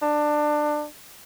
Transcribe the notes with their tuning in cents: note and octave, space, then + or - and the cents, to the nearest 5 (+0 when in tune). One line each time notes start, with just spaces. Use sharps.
D4 +20